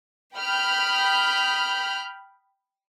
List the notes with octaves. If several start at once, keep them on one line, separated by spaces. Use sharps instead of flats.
G5 B5 D#6 F6 G6